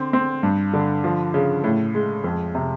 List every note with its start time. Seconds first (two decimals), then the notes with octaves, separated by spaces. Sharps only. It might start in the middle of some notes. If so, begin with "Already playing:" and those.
Already playing: D3 C4
0.13 C4
0.43 G2
0.73 D3
1.04 F3
1.34 C#3
1.64 A2
1.95 G#3
2.24 F2
2.55 C3